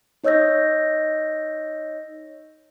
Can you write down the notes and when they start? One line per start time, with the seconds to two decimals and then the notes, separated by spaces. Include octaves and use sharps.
0.24 D#4 C#5 D#5 E6 G6 A#6